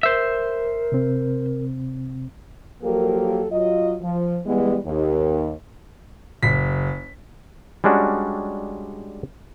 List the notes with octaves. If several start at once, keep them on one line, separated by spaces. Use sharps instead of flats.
A#4 C5 E5
C3 C4
F3 F#3 A#3 G4 A4 A#4
F#3 F4 D#5
F3
E3 G3 G#3 B3
D#2
F#1 B6
G3 G#3 C#4 D4 F#4